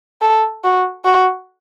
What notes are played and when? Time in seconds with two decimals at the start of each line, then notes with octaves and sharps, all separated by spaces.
0.22 A4
0.64 F#4
1.05 F#4